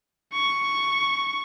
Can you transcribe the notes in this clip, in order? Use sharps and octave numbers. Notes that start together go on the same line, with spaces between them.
C#6